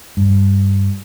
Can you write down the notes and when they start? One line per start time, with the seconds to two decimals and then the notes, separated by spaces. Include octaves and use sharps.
0.17 G2